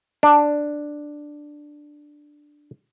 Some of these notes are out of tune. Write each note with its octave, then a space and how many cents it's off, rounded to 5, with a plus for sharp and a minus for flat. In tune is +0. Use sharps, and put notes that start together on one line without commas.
D4 +5